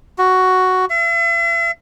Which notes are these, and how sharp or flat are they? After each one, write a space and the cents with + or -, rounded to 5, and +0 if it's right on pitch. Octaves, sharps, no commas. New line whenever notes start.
F#4 +5
E5 +40